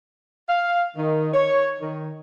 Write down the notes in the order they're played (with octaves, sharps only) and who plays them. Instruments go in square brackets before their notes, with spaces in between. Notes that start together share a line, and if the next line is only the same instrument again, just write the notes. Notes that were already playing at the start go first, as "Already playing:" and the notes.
[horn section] F5
D#3
C#5
D#3